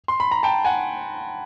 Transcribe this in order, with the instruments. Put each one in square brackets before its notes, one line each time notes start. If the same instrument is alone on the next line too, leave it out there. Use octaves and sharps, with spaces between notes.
[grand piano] C6
B5
A#5
G5 A5
F#5 G#5